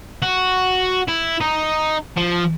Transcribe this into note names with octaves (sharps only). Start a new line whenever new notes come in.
F#4
E4
D#4
F3